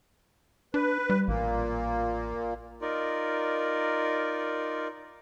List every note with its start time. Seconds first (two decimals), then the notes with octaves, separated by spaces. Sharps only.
0.74 D4 B4
1.10 G3
1.28 A1 A#2 A#3
2.81 D#4 F4 A#4 D5